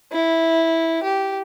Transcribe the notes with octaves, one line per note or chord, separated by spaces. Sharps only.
E4
G4